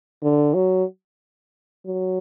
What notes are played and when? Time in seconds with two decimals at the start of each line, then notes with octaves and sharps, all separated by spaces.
0.22 D3
0.54 F#3
1.86 F#3